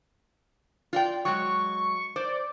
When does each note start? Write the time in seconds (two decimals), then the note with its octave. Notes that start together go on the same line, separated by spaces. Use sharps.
0.93 F4 D5 G5
1.25 F#3 G#3 C#6
2.16 C5 D5